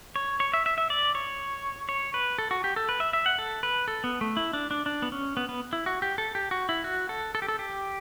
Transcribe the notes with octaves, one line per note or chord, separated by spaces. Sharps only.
C#5
C#5
E5
E5
E5
D5
C#5
C#5
B4
A4
F#4
G4
A4
B4
E5
E5
F#5
A4
B4
A4
B3
A3
E4
D4
D4
D4
B3
C#4
B3
B3
E4
F#4
G4
A4
G4
F#4
E4
F#4
A4
A4
G4
A4
G4